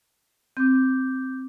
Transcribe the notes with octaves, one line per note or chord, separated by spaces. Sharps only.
C4 D6 G6